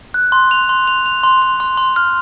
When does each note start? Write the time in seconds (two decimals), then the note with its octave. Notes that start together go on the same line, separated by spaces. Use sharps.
0.14 F#6
0.32 C6
0.51 F7
0.69 C6
0.87 F7
1.06 F7
1.23 C6
1.42 C6
1.60 C6
1.77 C6
1.96 F6